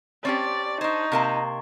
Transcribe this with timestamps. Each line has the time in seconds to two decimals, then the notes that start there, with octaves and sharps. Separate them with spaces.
0.25 C4 C#4 G4 D5 A5 C#6 A6
0.81 D4 D#4 C5 C#6 G#6
1.12 C3 A#3 A5 A#5 C6